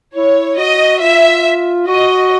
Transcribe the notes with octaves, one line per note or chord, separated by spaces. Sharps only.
E4 C#5
F#4 D#5
F4 E5
F#4 D#5